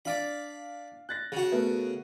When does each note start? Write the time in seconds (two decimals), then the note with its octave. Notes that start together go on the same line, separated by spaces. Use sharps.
0.05 D4 D5 F5 B5
1.09 F#6 A6 A#6
1.32 C#3 F#4
1.52 A3 B3 A#4